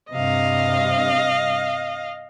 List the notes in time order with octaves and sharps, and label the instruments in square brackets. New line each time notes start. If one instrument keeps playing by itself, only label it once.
[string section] G2 C3 [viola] D#5 F5